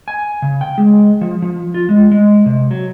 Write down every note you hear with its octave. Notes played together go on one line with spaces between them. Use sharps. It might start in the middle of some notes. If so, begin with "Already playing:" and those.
G#5
C#3
G5
G#3
F3
F3
F4
G#3
G#3
C3
F#3